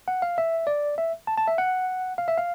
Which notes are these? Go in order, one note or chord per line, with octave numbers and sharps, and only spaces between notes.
F#5
F5
E5
D5
E5
A5
A5
E5
F#5
F5
E5
F5